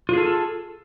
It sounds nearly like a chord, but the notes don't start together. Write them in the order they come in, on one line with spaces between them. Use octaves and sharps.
F4 G#4 A4